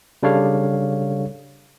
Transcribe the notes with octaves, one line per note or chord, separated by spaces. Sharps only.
C#3 G3 D4 A4 C#5 F5